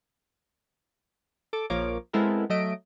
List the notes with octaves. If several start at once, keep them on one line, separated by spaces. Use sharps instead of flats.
A4 D6
A#1 F3 A#3 A#4 C#5 D6
G#3 B3 C4 E4 A4 A#4
F#3 A3 D#5 E5 D7